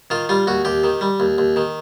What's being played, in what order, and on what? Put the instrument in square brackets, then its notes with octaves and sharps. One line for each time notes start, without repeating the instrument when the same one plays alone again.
[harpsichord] D#3 F4
G3 F4
D#2 F#4
D#2 G4
D#3
G3
D#2
D#2
D#3